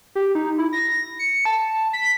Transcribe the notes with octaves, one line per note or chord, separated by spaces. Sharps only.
G4
D#4
E4
A#6
C#7
A5
B6